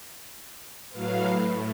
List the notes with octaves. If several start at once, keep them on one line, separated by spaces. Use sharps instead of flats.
A2 F#3 B4 F5
A2